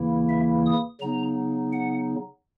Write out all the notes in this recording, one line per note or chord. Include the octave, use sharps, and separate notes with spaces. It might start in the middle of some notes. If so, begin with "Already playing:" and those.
Already playing: D#2 C#3 E3 A#3 E4
E5
D#6
C#3 F#3 B3 D#4 A#5
F#5